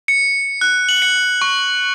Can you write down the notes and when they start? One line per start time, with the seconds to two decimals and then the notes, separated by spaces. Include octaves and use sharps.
0.08 C#7
0.61 F#6
0.89 F#7
1.02 C#7
1.42 C#6